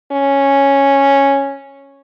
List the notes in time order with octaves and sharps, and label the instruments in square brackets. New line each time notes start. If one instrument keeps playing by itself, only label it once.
[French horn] C#4